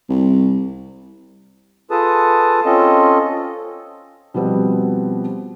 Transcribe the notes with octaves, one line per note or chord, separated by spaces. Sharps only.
C2
F4 G#4 A4 B4 A5 D#6
C4 C#4 F4 A4 D#5
B2 F3 G3 B3 C4